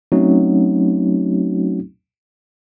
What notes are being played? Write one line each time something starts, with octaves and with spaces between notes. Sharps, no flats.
F#3 A3 C4 C#4 D#4 F#4